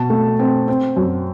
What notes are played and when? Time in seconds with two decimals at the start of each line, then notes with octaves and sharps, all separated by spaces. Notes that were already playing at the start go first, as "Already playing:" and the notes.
Already playing: B2 A5
0.10 A3
0.39 C4
0.68 C4
0.96 F#2